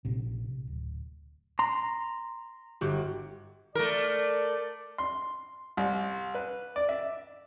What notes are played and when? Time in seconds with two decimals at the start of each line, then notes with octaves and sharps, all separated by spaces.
0.05 A#1 C3
0.67 D1
1.59 A#5 C6
2.81 G1 F#4 G4
3.75 A3 A#4 D5
4.98 C6
5.77 C2
6.35 B4
6.76 D5
6.89 E5